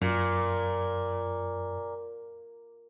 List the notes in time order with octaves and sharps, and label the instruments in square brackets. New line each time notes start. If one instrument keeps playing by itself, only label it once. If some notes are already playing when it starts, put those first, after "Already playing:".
[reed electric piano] F#2 [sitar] A#2